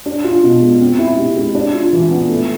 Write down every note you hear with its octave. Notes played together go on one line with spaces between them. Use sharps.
D4
F4
B2
G#3
C4
E4
C3
G#3
D4
F4
E3
B3
A3